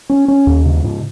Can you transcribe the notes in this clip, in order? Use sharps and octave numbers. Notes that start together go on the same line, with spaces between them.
C#4
C#4
D#2
C#3
G#2